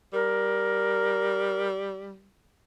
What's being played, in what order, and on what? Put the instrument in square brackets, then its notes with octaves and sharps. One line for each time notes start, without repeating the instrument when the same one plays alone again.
[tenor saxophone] G3 [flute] A#4